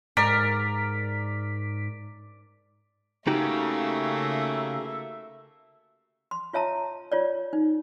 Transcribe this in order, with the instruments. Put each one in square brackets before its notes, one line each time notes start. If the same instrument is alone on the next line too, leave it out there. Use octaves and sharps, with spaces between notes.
[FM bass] G#2 [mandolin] A#4 [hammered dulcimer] D5 [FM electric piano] B6
[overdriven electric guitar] C#3 [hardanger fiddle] A3 A#3 [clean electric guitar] D#4 F#4 G4 [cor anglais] E5
[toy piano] C6
F4 C#5 E5 A5 A#5
F4 C#5 D5
D#4